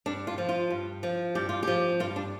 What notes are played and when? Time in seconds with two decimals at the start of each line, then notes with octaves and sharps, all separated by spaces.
0.06 G2 D4
0.27 F4
0.38 F3
0.49 F4
0.70 G2
1.03 F3
1.35 G2 G4
1.49 F4
1.63 F3 G4
2.00 G2 F4
2.16 D4